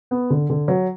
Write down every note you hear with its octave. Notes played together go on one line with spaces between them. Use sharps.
B3
D3
D3
F#3